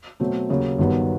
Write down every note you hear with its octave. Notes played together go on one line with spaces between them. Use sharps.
B2 F#3 A3 C4
D#2 C#3 F#3 A#3
G1 G2 D#3 F#3 B3